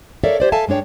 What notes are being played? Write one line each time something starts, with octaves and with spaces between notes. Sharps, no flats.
A4 A#4 C#5 D5 E5 F5
G4 C5 D5
A4 E5 F5 G#5 A5
G2 G#3 D4 C#5 G5